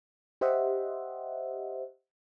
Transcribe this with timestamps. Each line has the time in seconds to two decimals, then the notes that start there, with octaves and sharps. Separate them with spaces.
0.41 G4 C5 D#5 E5 F#5